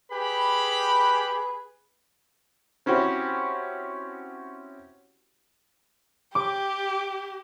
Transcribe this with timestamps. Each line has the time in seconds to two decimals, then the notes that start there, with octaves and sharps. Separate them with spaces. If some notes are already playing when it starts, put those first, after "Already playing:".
0.12 G4 G#4 B4 B5
2.86 C4 C#4 E4 F#4 G4
6.35 G4 D6